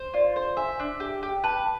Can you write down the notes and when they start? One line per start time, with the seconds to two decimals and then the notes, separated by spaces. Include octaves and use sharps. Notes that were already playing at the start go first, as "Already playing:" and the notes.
Already playing: C5
0.14 F4 D5
0.36 C5
0.57 E5 G#5
0.80 D4
1.00 G4
1.23 G4
1.44 B4 A5